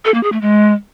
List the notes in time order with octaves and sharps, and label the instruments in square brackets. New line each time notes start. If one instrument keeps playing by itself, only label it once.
[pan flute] A4
A#3
G#4
A3
G#3